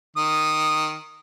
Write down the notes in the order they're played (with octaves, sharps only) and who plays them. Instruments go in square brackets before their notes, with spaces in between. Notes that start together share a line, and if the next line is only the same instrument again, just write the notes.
[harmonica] D#3 D#6